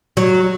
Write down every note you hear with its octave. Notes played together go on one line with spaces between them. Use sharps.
F#3